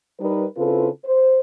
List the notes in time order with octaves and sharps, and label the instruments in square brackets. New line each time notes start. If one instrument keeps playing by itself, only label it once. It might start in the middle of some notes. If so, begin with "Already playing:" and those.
[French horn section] G3 D#4 A#4 B4
C#3 C4 E4 F4 A4 B4
C5